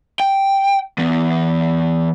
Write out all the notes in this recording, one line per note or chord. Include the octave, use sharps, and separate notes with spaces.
G5
E3 B3